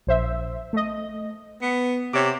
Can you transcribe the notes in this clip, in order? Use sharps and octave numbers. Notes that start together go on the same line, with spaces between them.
A#1 C5 E5
A3 D#5
B3 C#7
C3 C#5 D6